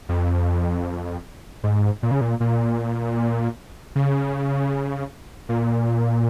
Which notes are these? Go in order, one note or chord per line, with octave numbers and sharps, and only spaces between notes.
F2
G#2
A#2
C#3
A#2
A#2
C#3
A#2